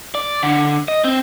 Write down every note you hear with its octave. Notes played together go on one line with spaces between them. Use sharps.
D5
D3
D#5
C4